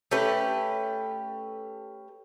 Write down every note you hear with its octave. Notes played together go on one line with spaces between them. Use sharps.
A3 C#4 G4 B4